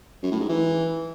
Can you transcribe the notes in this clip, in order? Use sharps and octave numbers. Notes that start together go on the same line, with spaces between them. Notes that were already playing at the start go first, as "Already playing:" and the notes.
F#2
A2
G#2
E3